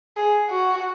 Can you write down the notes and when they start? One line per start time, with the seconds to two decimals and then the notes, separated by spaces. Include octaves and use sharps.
0.17 G#4
0.49 F#4